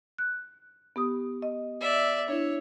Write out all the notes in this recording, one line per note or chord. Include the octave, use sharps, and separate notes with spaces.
F#6
B3 G4 D#6
D#5
D5 E5
D4 E4 C#5